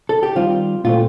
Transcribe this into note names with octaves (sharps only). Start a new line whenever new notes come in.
A4
G4
D#3 G3 C4 F4
A#2 A3 C4 F4